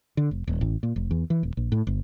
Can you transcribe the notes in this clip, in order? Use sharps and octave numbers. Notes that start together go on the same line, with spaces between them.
D3
F1
D#1
A1
A#2
F1
E2
E3
D#1
A#1
A2
G1